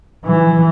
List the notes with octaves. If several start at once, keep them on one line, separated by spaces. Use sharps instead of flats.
E3